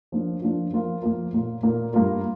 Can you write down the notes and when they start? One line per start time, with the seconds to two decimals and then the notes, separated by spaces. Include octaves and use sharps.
0.12 F3 A#3 D4 F4
0.42 F3 A#3 D4 F4
0.73 F3 A#3 F4 A#4
1.03 F3 A#3 F4 A#4
1.32 A#2 A#3 F4 A#4
1.63 A#2 A#3 F4 A#4
1.93 G2 G3 A#3 F4 A#4